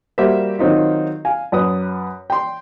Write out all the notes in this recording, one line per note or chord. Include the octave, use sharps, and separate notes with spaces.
G3 A#3 F#4 G4 C5 E5
D#3 F#3 C4 D#4 F4
F5 G#5
F#2 B4 D#6
G5 C6